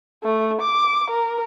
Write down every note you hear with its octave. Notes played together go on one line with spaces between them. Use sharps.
A3
D6
A#4